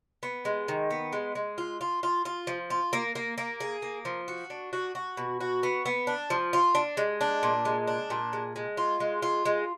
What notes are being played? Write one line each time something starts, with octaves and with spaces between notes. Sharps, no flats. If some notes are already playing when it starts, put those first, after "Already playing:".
B3
G#3
D#3
B3
G#3
G#3
F4
F4
F4
F4
F3
F4
A#3
A#3
A#3
G#4
A#3
F3
F#4
D4
F#4
F#4
B2
F#4
B3
B3
D4
F3
F4
D4
G#3
D4
A#2
G#3
D4
A#2
G#3
G#3
F4
G#3
F4
G#3